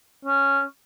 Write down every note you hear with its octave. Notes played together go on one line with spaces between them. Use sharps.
C#4